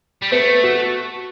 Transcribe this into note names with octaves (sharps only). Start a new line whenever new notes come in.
G3
A3 B3
F#4